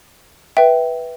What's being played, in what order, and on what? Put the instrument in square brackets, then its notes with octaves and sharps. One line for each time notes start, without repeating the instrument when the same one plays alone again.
[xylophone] B4 E5 G5